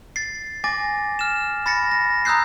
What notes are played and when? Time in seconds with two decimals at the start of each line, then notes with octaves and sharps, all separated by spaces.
0.16 A6 C7
0.64 G#5 D6 A6 A#6
1.19 F6 E7
1.66 B5 A6 A#6 C#7
1.92 A#6
2.25 A#5 D#6 E6 F#6 G6 C7